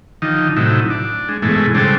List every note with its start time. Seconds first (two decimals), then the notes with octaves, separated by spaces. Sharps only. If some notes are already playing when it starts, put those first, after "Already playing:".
0.22 D3 D#3 F3 D#4
0.56 A2 C3 F#3 D#4 E4
0.90 D4
1.29 G#3
1.42 G#2 B2 E3 G#3 A3
1.75 C#3 G3 G#3 C4 D4 A4